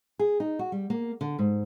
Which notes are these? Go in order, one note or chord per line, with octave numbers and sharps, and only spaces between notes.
G#4
D#4
F#4
G3
A#3
D3
G#2